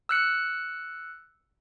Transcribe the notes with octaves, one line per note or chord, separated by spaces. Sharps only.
E6 F#6 C#7